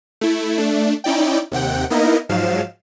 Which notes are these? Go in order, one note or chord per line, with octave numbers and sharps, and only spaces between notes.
A3 E4
A3 D4
C#4 D#4 E4 D5 G5
D#2 C3 F#5 G5
A#3 B3 D#4 E4 A#4 D#5
G#2 F3 F#3 F5 E7